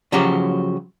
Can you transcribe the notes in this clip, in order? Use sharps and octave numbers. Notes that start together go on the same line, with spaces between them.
C#3 F3 F#3 C#4 F#4 G4